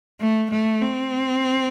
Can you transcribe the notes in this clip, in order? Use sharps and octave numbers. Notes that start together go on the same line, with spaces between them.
A3
A3
C4